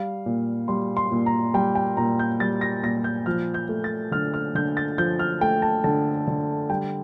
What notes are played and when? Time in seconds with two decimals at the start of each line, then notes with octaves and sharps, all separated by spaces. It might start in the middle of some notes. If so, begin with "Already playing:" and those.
Already playing: G3 F5
0.26 A#2
0.68 G3 C6
0.97 C6
1.12 A#2
1.26 A#5
1.54 G3 G5
1.75 G5
1.97 A#2 A#5
2.19 G6
2.40 G3 A6
2.61 A#6
2.83 A#2 A#6
3.04 G6
3.26 F3 F6
3.54 G6
3.69 A3
3.84 A6
4.12 D3 F6
4.34 F6
4.55 D3 G6
4.77 A6
4.98 F3 G6
5.19 F6
5.41 A3 G5
5.62 A5
5.84 D3 A5
6.27 D3
6.70 G3 G5